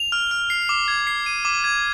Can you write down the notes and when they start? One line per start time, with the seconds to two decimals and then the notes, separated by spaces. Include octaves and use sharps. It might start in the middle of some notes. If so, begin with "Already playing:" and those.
Already playing: F7
0.12 F6
0.31 F6
0.50 C7
0.69 D6
0.88 G#6
1.07 C7
1.26 D#7
1.45 D6
1.64 G#6